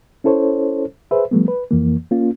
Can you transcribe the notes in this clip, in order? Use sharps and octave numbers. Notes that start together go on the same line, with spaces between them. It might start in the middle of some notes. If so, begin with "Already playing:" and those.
C#4 E4 A4 C5 C#5
G#4 B4 C5 E5
F3 G3 A3 B3
B4
F2 E3 A#3
A#3 C#4 F4